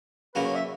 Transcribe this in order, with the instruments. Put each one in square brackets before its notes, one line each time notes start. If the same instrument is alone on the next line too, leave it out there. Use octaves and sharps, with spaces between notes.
[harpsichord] C#3 F#3 A#3 [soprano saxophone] B4
[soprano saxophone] C#5
E5